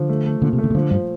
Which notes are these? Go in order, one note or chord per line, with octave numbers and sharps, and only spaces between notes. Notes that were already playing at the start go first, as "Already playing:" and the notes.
Already playing: D3 F3
A3
A3
A#2 D3
C3
A3
D3
C3
D3 F3
G2 F3